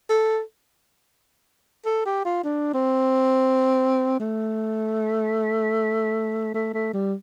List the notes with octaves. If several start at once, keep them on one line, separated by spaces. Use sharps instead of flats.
A4
A4
G4
F4
D4
C4
A3
A3
A3
G3